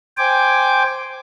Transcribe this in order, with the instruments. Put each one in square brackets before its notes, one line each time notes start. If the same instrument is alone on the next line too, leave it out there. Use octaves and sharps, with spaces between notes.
[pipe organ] C5 G5 G#5 D6